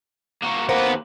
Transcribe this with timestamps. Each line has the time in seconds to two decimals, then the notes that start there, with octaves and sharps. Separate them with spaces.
0.42 A#3 F#4
0.69 D#2 A#3 B3 B4 C5 F#5